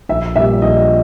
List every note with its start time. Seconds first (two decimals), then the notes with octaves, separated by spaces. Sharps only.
0.09 A#1 E5
0.35 A#2 G3 E5
0.62 A#1 D#5